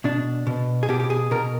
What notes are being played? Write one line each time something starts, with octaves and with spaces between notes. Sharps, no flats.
B2 D4
B2
G#4
B2 G4
G4
G#4
B2 A#4